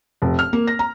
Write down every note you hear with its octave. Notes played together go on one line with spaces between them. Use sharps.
F1
F6
A#3
A#6
A#5